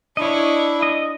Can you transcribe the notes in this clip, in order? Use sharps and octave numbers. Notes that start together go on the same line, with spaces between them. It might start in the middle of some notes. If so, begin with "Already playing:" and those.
D4 E4 C#5 D#5
D#5 D#6